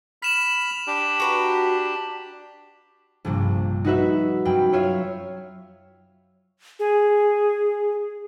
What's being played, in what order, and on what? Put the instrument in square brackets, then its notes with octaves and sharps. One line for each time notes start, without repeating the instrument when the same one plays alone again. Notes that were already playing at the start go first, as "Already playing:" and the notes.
[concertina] B5 F6 [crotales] B6 E7 F#7
[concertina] D4 G4
[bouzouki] F#4 B4 A#5
[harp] A#1 G2 C3
D#4 F#4 B4 E5
F#2 C4 G5 B5 G6
F4 C#5 E5 F5
[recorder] G#4